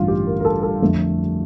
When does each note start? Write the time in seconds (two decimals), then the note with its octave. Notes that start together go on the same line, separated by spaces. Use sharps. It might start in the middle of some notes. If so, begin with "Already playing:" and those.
Already playing: A1 G2 D3 F4
0.08 G4
0.27 A#4
0.40 A#4
0.45 A4
0.63 A4
0.82 F2 D3 F3 A3